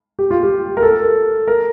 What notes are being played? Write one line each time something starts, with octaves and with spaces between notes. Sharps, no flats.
G4
F4
G4
A#4
A4
A#4